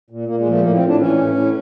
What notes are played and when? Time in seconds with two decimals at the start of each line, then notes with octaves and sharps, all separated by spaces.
0.10 A#2
0.27 A#2 A#3
0.39 G#3
0.47 F3
0.52 A3
0.64 A2 A#3
0.76 C4
0.81 A2
0.88 D4
0.99 E3 C#4
1.18 A2
1.35 A2